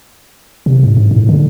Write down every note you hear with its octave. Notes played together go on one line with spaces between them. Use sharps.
C3
G#2
G#2
A2
D3